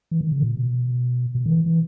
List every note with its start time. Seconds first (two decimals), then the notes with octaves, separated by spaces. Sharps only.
0.11 E3
0.21 D#3
0.32 C#3
0.42 A#2
0.57 B2
1.35 B2
1.46 D#3
1.50 E3
1.66 E3